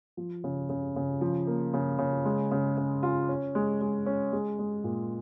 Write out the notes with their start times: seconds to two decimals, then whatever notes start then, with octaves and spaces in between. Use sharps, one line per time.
0.17 F3
0.44 C#3
0.69 C#3
0.96 C#3
1.21 F3
1.47 A#3
1.74 C#3
1.99 C#3
2.25 G#3
2.51 C#3
2.77 C#3
3.03 F4
3.29 C#4
3.55 G#3
3.81 G#3
4.06 C#4
4.32 G#3
4.59 G#3
4.84 A#2